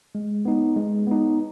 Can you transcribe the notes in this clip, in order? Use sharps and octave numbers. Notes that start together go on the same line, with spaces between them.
G#3
B3 D#4
G#3
B3 D#4